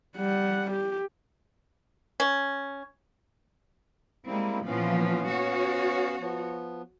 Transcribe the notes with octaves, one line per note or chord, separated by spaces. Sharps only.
G3 F#5
G4
C#4
G3 G#3 A#3 C4 E4
A#2 E3 F3 B3 C#4 F5
F#4 C#5
F3 B3